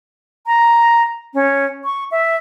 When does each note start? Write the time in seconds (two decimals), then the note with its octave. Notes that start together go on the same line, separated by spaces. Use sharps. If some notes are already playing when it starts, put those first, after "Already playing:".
0.47 A#5
1.34 C#4
1.84 C#6
2.11 E5